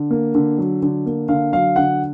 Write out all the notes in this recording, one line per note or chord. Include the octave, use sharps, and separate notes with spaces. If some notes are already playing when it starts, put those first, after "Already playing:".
Already playing: D3
A#3
D3
F#3
D3
A#3
D3 F5
F#3 F5
D3 F#5